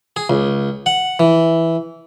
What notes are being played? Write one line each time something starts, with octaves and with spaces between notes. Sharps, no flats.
G#4
C#2
F#5
E3